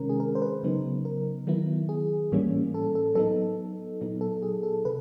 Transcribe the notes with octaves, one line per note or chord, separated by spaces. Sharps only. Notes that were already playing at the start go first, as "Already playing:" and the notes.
Already playing: C3 D#3 G#3 C#4 A#4
G#4
A#4
C5
B4
C#3 F#3 B3 D#4
A#4
D#3 F#3 B3 E4
G#4
A2 E3 G3 A#3 C#4
A4
A4
F#3 B3 D#4 A4
A#2 F#3 B3 D#4
A4
G#4
A4
C3 B4